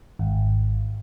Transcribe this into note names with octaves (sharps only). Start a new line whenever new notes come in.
G#1